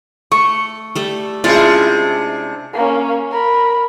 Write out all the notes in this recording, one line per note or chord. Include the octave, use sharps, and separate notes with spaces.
A3 C#6
G3 A3
C3 G#3 C#4 D4 E4 F4 G#4
A#3 C#4
A#4 B5